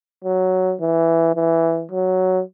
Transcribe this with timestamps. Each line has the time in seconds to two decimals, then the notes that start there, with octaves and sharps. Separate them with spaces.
0.25 F#3
0.81 E3
1.36 E3
1.92 F#3